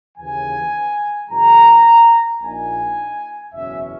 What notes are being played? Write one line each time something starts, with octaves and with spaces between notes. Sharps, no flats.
D#2 C#3 E3 G#5
F#2 C#3 E3 G#3 A#5
A#1 A#2 A#3 D#4 G#5
F#1 E2 B2 F#3 C#4 E5